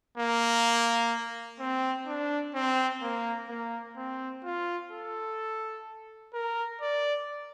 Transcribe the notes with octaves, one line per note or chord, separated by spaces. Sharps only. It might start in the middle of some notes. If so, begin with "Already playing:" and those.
A#3
C4
D4
C4
A#3
A#3
C4
F4
A4
A#4
D5